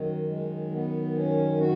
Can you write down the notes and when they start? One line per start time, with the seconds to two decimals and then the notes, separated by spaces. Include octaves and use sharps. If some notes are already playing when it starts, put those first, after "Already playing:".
Already playing: F#2 D#3
0.28 G#3
0.72 B3
1.14 C#4
1.57 F#4